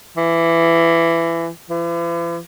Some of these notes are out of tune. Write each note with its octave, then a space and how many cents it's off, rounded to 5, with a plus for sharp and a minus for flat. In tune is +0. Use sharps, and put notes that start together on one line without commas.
E3 +20
E3 +45